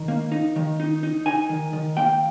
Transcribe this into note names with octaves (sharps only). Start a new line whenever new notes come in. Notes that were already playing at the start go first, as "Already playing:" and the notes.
Already playing: D#3
A#3
D#4
D#3
D#4
D#4
D#4 G#5
D#3
D#3
A#3 G5